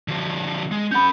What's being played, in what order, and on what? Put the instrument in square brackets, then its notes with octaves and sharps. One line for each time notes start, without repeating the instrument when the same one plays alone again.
[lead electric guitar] D3 F3
G#3
[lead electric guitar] C#4 F#5 [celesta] B5 G6